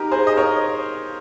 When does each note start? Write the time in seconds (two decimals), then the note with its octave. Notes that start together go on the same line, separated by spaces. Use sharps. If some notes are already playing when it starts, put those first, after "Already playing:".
Already playing: D#4 G4 A#4
0.12 G#4 C5
0.27 D#5
0.37 A#4 C#5